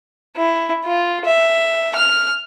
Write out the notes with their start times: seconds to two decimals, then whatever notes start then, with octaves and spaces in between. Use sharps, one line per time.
0.36 E4
0.85 F4
1.25 E5
1.96 F6